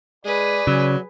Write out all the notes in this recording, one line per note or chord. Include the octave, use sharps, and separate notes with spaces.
G#3 G#4 B4 D5
C#3 F#3